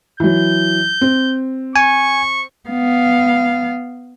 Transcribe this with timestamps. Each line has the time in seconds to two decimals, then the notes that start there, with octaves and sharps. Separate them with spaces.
0.20 E3 F#3 G6
1.01 C4
1.76 G#5 C#6
2.70 B3 F5